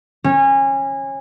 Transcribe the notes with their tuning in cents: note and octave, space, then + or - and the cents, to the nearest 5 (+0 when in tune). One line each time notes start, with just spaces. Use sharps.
C#4 -25